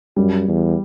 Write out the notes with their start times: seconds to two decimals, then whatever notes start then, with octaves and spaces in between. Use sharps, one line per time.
0.17 F#2 G3
0.48 E2